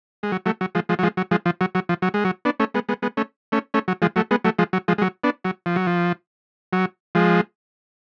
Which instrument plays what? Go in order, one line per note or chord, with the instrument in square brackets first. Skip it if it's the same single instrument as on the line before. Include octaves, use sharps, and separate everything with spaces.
[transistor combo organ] G#3
F#3
F#3 A3
F#3
F3 G#3
F3 G#3
F#3
F3 G#3
F#3
F3 G#3
F3
F#3
F#3
F3
F#3
G#3
F#3
B3 D4
A3 C#4
G#3 B3
G#3 B3
G#3 B3
A3 C#4
A3 C#4
A3 C#4
F#3
F3 G#3
F#3 A3
G#3 B3
F#3 A3
F3 G#3
F#3
F3 G#3
G#3
F#3
B3 D4
F#3
F3
F#3
F3
F#3
F3 G#3